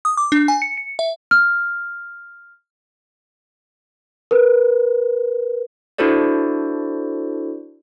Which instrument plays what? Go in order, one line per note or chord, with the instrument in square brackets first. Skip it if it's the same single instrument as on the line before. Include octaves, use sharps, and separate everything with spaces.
[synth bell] D#6
D6
D4
G#5
C#7
C#7
E5
[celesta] F6
A#4 B4
[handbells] D4 E4 F#4 A4 C5 D5